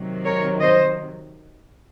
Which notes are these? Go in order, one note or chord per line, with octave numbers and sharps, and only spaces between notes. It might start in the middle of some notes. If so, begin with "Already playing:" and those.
Already playing: C3 D#3 F#3
A#4 C#5
C5 D#5